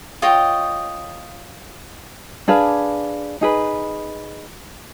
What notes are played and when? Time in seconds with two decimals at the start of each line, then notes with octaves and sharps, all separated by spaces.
0.22 F4 C#5 D#5 G5
2.48 D4 G#4 B4 F5
3.41 D#4 G#4 B4